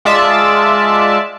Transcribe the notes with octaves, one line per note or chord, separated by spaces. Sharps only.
G#3 F4 D5 E5 A5